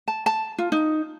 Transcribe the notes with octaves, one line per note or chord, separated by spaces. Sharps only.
A5
A5
F4
D#4